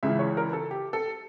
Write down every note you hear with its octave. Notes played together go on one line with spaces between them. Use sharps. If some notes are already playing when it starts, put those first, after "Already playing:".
C#2 C#3 E3 E5
C#5
A#4
A4
G4
A4